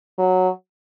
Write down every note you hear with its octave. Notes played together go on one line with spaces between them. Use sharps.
F#3